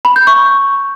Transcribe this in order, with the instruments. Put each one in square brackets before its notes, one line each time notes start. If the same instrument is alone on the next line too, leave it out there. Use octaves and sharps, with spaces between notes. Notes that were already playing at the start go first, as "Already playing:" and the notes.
[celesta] B5
G6
C#6